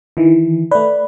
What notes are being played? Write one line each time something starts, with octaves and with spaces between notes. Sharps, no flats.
D#3 E3
A3 B4 D5